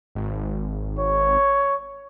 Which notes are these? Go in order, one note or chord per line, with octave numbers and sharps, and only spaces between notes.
G#1
C#5